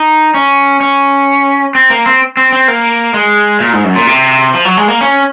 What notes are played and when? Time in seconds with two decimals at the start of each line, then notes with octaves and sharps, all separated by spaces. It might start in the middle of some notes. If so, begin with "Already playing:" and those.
Already playing: D#4
0.34 C#4
0.81 C#4
1.75 C4
1.90 A#3
2.06 C4
2.37 C4
2.52 C4
2.68 A#3
3.14 G#3
3.60 A#2
3.73 G#2
3.84 F#2
3.96 A#2
4.07 C3
4.54 F3
4.65 F#3
4.77 G#3
4.88 A#3
5.01 C#4